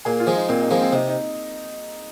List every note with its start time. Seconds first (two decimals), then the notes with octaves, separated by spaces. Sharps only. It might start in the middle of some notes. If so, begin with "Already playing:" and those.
0.05 A#2 G#4
0.20 F4
0.27 F3 G#3
0.34 D#4
0.49 A#2 C4
0.60 D#4
0.71 F3 G#3 A#3
0.81 C4
0.92 C3 D#4
1.07 D#4